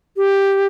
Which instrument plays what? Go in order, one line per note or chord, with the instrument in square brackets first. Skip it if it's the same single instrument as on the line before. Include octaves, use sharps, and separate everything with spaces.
[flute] G4